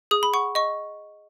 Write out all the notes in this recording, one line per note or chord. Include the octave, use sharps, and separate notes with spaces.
G#4 D#6
B5
F#5 C#6
D#5 C#6